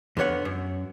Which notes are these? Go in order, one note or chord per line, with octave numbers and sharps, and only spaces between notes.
F2 D3 B3 C#5 F#5
F#2